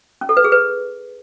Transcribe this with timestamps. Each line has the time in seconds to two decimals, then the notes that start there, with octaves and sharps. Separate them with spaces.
0.21 C#4
0.29 A4
0.37 B4
0.44 G#4
0.52 B4